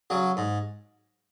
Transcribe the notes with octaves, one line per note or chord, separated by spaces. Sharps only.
C#3 F#3
G#2